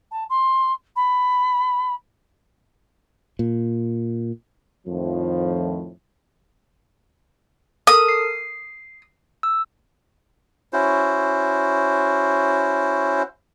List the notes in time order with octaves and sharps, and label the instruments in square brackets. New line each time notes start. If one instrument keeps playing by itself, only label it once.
[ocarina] A5
C6
B5
[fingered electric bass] A#2
[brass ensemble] F2 A2 D#3 F3
[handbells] A4 A#4 [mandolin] D#6
[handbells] C7
E6
[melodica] C#4 E4 F#4 C5